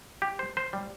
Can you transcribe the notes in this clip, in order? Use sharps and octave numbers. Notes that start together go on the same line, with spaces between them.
G4
C5
C5
G3